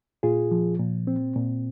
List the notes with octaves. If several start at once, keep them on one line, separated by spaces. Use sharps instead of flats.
A#2 F4 G#4
F3
A#2
C4
A#2